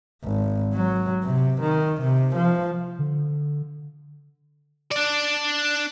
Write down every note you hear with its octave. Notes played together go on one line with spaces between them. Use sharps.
G#1
F#3
C3
D#3
C3
F3
D3
D4 D5